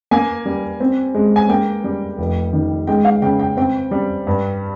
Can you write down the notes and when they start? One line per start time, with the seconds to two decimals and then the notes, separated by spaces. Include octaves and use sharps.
0.11 A#3 G#5
0.45 G3
0.80 C4
1.14 G#3
1.36 G#5
1.49 A#3 G5
1.84 G3
2.18 F1
2.53 D#3
2.87 G#3 G5
3.05 F5
3.22 C#3 G5
3.39 G5
3.57 C4 G5
3.91 G3
4.27 G2